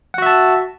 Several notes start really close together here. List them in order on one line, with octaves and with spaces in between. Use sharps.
F#5 F#4 E5 A5